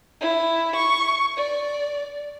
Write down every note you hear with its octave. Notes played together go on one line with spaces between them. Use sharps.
E4
C#6
D5